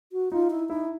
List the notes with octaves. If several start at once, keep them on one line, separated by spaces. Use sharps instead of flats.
F#4
D#4 F4
E4
D#4 E4